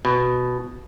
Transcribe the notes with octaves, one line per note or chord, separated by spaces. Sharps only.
B2